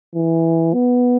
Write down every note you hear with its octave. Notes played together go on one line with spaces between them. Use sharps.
E3
B3